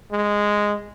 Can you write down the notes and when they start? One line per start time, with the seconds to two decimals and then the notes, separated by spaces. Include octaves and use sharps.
0.12 G#3